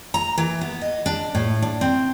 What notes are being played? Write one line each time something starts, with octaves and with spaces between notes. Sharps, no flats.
A#5
E3
B3
D#5
D4
A2
D4
C4